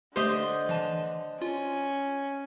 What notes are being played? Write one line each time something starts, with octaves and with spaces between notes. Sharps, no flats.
D3 A3 G4 C5 D#5
E3 A5
C#4 F4